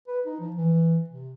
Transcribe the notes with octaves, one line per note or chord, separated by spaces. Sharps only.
B4
D#4
F3
E3
C3